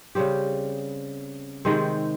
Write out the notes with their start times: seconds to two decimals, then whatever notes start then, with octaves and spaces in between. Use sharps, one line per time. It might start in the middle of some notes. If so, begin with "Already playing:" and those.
0.15 C#3 G3 C4 G4
1.65 C3 D#3 G#3 C4